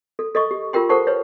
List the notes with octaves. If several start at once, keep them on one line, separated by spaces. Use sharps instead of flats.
A4
A4 D#5 C#6
G4
F4 G4 A#4 G5 C6
A4 A#4 C5 F#5 A5 C#6
B4 C#5